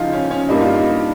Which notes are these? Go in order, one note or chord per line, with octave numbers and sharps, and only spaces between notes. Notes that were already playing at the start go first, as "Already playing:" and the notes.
Already playing: C#2 C#3 F3 D#4 F4
C#4
C#4
G2 G3 A#3 D#4
F4
D#4